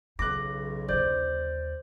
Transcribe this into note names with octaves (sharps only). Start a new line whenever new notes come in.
B1 C#3 E4 F4 D6 F#6 A#6
D#2 D3 C5 D5 G6